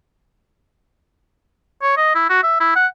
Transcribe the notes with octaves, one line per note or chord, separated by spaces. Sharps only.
C#5
D#5
E4
F#4
E5
E4
F#5